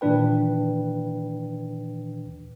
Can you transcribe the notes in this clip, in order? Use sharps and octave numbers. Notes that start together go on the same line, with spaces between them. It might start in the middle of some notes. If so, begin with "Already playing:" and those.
A#2 D#3 E3 D4 B4 G5